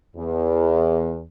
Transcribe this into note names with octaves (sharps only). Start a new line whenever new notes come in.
E2